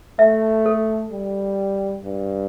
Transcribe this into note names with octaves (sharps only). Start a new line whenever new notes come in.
A3 E5
A4
G3
G2